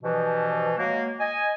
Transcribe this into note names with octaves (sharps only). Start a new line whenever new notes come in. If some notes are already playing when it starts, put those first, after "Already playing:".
G2 B2 E3 F3
F#3 G#3 A#3
D#5 G#5